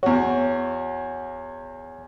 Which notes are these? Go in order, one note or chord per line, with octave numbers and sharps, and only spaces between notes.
E2 F#4 C#5